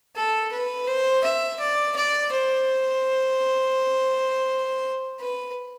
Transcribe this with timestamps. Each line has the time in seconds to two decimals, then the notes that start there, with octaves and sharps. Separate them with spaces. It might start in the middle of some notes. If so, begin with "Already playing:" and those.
0.16 A4
0.52 B4
0.87 C5
1.24 E5
1.60 D5
1.96 D5
2.32 C5
5.20 B4